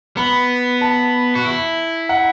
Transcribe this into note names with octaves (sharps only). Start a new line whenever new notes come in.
B3 B5
A5
F#4
E4
F#5